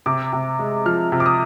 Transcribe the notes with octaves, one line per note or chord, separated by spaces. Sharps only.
C3 D6
C3
G#3
F3 F6
C3
D6
D#6